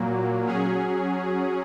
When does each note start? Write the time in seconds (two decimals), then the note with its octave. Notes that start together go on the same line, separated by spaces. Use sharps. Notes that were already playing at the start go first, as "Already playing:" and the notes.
Already playing: A#2 F#3 A#3
0.46 F#3 C#4 G#4